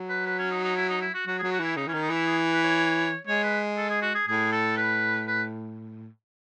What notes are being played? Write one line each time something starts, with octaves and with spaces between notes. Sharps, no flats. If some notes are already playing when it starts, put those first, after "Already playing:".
Already playing: F#3
B4
B4
C#4
D#4
D#4
E4
D#4
E4
F#4
F#3 F#4
F#3 G#4
F#4
E3 E4
C#3 D#4
E3 C#4
D#3
D#4
E3 E4
G#4
B4
C#5
G#3 C#5
B4
A4
G#4
F#4
G#4
A2 G#4
A4
B4
B4